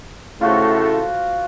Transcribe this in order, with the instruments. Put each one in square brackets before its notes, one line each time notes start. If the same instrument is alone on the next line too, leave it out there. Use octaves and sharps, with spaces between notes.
[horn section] A2 C#3 A3 [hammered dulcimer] F4 F#4 C5